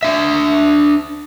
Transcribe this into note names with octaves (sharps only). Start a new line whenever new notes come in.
D4 E5